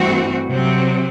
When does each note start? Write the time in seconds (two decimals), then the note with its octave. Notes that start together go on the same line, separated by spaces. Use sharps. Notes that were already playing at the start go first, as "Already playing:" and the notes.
Already playing: G2 E3 A3 C4 F#4
0.48 C3 F#3 C4